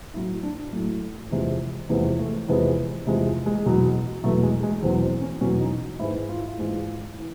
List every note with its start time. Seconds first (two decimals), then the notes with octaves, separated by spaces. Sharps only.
0.14 A2 F#3 E4
0.43 D4
0.72 A2 F#3 A3
1.31 E2 C3 F3 G#3
1.89 E2 C3 F3 G#3 B3
2.19 A3
2.48 E2 C3 F3 G#3 B3
3.07 E2 C3 F3 G#3
3.46 G#3
3.65 E2 B2 F#3
4.24 E2 B2 F#3 A3
4.43 G#3
4.63 G#3
4.82 E2 B2 F#3 C4
5.02 C4
5.21 C#4
5.41 E2 B2 F#3 C#4
5.60 D#4
5.99 G#2 E3 G#3 E4
6.29 F4
6.38 E4
6.47 F4
6.58 G#2 E3 G#3 F4
7.19 E3